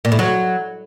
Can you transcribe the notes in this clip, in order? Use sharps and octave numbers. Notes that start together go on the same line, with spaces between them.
A#2
A2
F#3